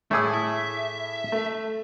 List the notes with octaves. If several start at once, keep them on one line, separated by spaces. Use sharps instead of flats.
A2 A3 E4 G#4 D6 E6
E5
A3